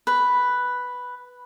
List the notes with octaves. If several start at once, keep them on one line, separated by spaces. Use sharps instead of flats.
B4